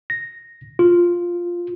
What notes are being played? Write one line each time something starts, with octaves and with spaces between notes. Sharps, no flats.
A#6
F4